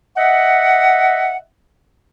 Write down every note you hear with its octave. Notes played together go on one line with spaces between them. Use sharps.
D#5 E5 F#5